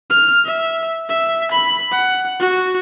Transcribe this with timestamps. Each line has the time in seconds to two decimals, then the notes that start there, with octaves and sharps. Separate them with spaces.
0.10 F6
0.45 E5
1.09 E5
1.52 B5
1.92 F#5
2.40 F#4